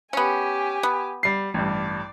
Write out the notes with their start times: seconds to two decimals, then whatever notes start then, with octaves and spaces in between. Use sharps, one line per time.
0.13 B3 C#4 G4 G#5
0.83 B3
1.23 G3 C7
1.54 A1 G2 D5